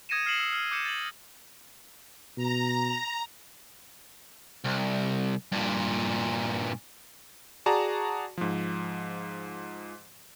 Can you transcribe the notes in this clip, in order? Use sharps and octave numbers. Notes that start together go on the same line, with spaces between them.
D#6 G#6 A#6 C#7 D#7 E7
D#6 F6 C7 C#7 E7 F#7
D#6 E6
F6
D6 G6 C#7 E7
A6 F#7
B2 A#5
C2
G2 A#2
F#4 G#4 D5 A5 A#5
G#2 F3